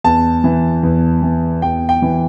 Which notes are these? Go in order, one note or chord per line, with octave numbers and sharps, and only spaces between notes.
E2 A5
E3
E2
E3
E2 G5
G5
E3